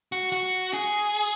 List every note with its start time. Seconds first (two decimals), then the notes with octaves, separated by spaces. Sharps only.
0.12 F#4
0.32 F#4
0.73 G#4